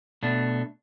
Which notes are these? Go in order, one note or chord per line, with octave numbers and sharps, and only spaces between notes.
B2 A3 D4